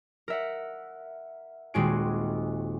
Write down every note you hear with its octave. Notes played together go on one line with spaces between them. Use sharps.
A#4 E5 F#5
D#1 G#3 C4 F#4 G#5 D7